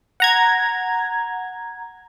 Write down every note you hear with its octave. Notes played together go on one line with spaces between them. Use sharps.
F#5 A#5 G#6